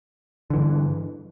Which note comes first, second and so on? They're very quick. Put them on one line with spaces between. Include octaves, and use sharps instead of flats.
D3 E3 G2